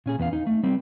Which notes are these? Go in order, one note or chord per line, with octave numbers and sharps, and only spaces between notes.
A#2 C#4 G#4
E2 B3 F5
D#4
A3
G3 B3 C4